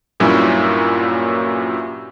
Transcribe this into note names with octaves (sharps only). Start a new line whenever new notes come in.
G2 A#2 F#3 C#4 E4